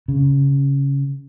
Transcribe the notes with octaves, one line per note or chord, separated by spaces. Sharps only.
C#3